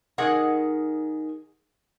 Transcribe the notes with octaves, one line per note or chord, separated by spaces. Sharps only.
D#3 G#4 A#4 F#5